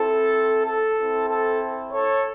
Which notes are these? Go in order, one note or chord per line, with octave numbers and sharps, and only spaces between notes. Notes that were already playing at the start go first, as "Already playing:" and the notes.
Already playing: C4 E4 A4
A4
C4 E4
A4
A4 C#5